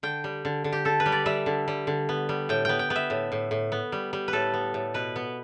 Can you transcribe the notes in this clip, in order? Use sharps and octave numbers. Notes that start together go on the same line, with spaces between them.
D3 G5
G3
D3
D3
G4
D3 A4
B4
G3
D5
G3 E5
D3
G3
D3
B3
G3
A2 G5
B3 G5
G5
B3
E5
A2
A2
A2
B3
G3
G3
B4
A2 A4
B3
A2
B2 B4
B3